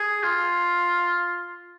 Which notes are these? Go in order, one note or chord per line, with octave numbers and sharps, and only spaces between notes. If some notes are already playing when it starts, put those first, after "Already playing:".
Already playing: G#4
F4